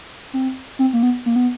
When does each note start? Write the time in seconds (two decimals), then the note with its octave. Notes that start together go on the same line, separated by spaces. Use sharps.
0.33 C4
0.79 C4
0.93 A#3
1.03 B3
1.26 A#3
1.36 B3